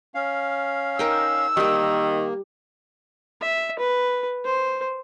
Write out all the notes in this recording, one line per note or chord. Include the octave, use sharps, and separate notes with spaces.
C#4 F5
D#4 A#4 G5 E6
D#3 G3 A#3 G4
E5
B4
C5